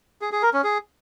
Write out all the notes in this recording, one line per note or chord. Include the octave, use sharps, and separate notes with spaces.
G#4
G#4
A#4
C#4
G#4